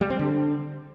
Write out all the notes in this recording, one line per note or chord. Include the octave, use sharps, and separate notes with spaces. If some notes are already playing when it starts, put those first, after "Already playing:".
G3
C4
D3